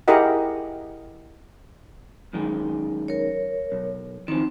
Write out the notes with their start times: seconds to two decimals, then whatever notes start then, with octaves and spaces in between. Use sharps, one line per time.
0.08 E4 G4 G#4 A#4 D#5 F#5
2.33 F#2 D#3 G#3
3.08 A#4 C#5
3.72 B1
4.28 D#3 F3 C4